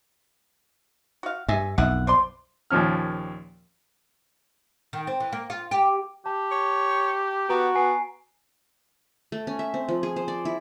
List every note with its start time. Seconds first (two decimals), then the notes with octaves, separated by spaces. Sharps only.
1.23 F#4 F5
1.48 G2 E5 G#5
1.78 B1 F2 D#3 E4 F#5
2.07 C5 D5 C6
2.71 D#2 A#2 F3 C#4 F6
4.93 D#3
5.07 C4
5.20 E3
5.33 A#3
5.50 F4
5.71 G4
6.26 G4 A5
6.51 C#5
7.49 B3 F#4 A#5 D7
7.76 B3 G#5 C7
9.32 A3
9.47 C#4
9.59 E5
9.74 C4
9.89 F3
10.03 G#4
10.16 C5
10.28 D5
10.45 E4